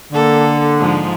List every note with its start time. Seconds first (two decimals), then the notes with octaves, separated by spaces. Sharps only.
0.12 D3 A#3 A4
0.79 G#2 F3 G#3